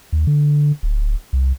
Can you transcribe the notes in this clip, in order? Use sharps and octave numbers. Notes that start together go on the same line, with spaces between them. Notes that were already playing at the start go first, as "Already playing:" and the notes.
D#2
D3
D1
C2